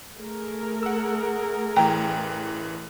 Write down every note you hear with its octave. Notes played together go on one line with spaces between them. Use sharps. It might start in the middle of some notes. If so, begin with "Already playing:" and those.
A3 G#4 A#4
F#5 E6
A1 E3 B4 G5 A#5